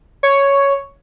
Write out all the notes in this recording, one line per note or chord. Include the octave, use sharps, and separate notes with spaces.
C#5